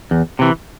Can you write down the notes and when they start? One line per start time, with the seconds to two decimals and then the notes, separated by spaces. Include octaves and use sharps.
0.11 E2
0.39 C3 E3